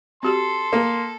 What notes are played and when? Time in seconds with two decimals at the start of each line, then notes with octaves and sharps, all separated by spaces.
0.23 C4 F#4 G4 A4 C6
0.73 A#3